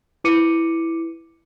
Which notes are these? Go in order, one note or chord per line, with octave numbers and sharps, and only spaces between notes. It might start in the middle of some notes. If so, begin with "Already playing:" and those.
E4 B4 D6 C#7 D#7